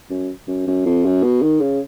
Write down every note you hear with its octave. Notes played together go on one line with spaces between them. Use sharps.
F#2
F#2
F#2
F2
F#2
B2
D#3
C#3